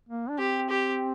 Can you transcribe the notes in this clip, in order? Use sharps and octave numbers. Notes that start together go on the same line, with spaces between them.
A#3
D4
C4 G4
G4